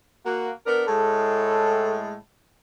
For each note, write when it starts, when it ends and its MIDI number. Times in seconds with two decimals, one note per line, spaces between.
0.25 0.50 58
0.25 0.50 66
0.66 0.84 59
0.66 0.84 62
0.66 0.84 70
0.87 2.16 45
0.87 2.16 56
0.87 1.98 69